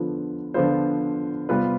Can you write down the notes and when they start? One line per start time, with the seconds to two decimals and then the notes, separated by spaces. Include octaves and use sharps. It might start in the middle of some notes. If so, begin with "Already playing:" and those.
Already playing: D3 F3 B3 F4
0.54 D3 F3 B3 F4 C5
1.49 C3 G3 B3 F4 B4